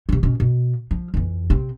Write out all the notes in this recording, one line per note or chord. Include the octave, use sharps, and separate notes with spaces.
C3 D#3
B2 C#4
B2
F3
F2 E3
C3 C4